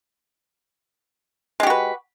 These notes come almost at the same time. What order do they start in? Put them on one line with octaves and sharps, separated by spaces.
G#3 G4 F#4 B4